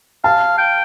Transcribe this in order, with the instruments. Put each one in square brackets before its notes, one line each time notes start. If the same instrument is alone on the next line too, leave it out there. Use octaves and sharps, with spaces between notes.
[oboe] F5 [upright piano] A5
[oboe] G5